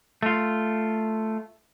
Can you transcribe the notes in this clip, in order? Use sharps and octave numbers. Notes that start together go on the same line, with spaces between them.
A3 F4